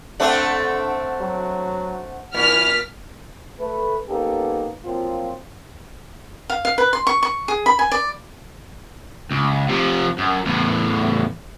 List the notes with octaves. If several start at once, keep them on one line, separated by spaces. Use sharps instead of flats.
D3 A3 C4 D4 F#5
F#3
A#2 E3 F6 B6
A3 B4
A#3 B3 C#4 D#4 G4 A4
F3 F#3 A#3 C4 F4
F5
F5
B4
C6
C#6
C#6
G#4
B5
G#5
D5
C#2
C3 F3
F#2
E2 A2